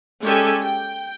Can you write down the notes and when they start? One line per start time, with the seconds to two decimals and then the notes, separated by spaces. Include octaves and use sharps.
0.22 G#3 C#4 G4 A4 D5 G#5
0.63 G5